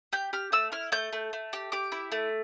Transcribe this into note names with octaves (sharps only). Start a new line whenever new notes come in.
G4 G6
G4 F6
A3 E6
E4 F6
A3 G6
A3
A3
G4
G4 D6
E4
A3